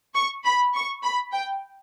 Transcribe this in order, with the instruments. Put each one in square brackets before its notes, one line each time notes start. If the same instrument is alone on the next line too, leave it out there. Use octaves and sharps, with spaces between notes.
[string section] C#6
B5
C#6
B5
G5